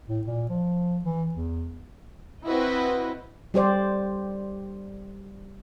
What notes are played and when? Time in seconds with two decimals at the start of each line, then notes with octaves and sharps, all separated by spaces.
0.08 A2
0.27 A#2
0.49 F3
1.04 E3
1.35 E2
2.45 C4 E4 F#4 B4 D#5
3.54 G3 G4 C5 D5